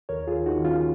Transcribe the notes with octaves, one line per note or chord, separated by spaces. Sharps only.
D#2 A#4 C#5
F4 G#4
D#2
D#4 F#4
D#3
C#4 F4